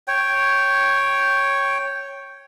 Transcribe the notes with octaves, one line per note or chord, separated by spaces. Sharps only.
C#5 G5